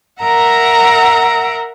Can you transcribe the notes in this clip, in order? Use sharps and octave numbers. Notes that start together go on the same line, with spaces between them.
A#4 E5 F#5 A#5